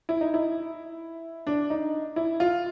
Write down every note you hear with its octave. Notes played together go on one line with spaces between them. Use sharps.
E4
D#4
E4
D4
D#4
E4
F4